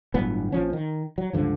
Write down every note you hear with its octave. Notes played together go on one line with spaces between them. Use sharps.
G1 A2 F#3 B3
A#1 F3 C#4
D#3
F#3
C#2 G2 D3 F3